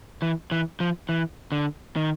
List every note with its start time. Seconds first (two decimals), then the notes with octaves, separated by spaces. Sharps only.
0.22 E3
0.51 E3
0.80 F3
1.09 E3
1.52 D3
1.96 D#3